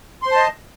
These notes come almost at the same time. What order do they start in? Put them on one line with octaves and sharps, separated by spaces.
C6 C5 A5 D#5